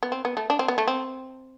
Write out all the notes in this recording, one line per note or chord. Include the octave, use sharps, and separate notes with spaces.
B3
C4
B3
A3
D4
C4
B3
A3
C4